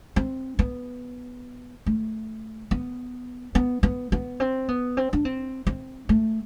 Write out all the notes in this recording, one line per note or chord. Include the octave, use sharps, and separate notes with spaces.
C4
B3
A3
B3
B3
B3
B3
C4
B3
C4
D4
C4
C4
A3